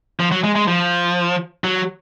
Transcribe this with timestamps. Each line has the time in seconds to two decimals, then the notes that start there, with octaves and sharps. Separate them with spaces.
0.20 F3
0.32 F#3
0.44 G#3
0.55 G#3
0.68 F3
1.64 F#3